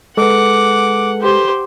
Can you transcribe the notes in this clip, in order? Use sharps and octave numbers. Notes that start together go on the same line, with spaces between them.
G#3 A4 B4 F#5 D6
G4 C5